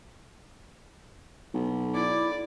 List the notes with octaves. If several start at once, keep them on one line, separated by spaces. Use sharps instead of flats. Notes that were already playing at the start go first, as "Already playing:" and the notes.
B1
E4 D5